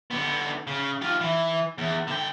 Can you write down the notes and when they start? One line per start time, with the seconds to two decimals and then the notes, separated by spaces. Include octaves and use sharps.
0.11 D3 B3
0.67 C#3
1.01 F4 G4
1.21 E3
1.78 E2
2.08 D3 G5